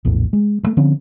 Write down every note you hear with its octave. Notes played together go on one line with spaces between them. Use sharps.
A#1 E2 A2
G#3
G2 A3
D3 F3 C4 C#4